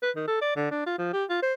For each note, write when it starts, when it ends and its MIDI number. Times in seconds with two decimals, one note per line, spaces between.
0.03 0.11 71
0.16 0.25 51
0.28 0.41 69
0.41 0.54 74
0.56 0.68 50
0.71 0.84 62
0.86 0.95 65
0.98 1.13 53
1.13 1.24 67
1.29 1.42 65
1.43 1.54 72